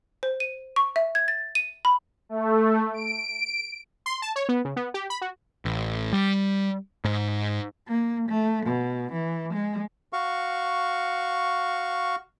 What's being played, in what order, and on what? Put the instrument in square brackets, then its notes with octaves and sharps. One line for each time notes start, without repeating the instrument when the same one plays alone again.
[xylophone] C5
D#7
C#6
E5
G#6
A6
D#7
B5
[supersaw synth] A3
D7
[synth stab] C6
A5
C#5
B3
C#3
B3
G4
B5
F#4
[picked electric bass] A1
G3
G#2
[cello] A#3
A3
B2
E3
G#3
[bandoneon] F#4 F5 C#6